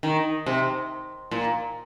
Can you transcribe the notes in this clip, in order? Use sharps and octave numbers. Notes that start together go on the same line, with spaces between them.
D#3
C3
A#2